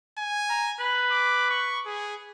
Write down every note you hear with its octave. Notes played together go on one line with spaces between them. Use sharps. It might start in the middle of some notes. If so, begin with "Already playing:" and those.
G#5
A#5
B4
D6
C#6
G#4